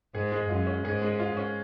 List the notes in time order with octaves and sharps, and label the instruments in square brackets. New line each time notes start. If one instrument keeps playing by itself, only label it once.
[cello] G#2 [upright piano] G#4
[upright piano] G#3
[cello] F#2 [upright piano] F4
[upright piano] C#4
[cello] G#2 [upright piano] G#4
[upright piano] G#3
F4
C#4